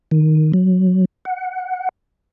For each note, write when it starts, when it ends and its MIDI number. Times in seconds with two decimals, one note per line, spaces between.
0.11 0.52 51
0.54 1.05 54
1.25 1.89 78